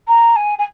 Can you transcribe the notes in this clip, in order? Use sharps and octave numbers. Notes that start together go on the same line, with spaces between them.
A#5
G#5
G#5